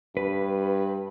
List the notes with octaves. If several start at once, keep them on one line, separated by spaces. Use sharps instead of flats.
G2 B4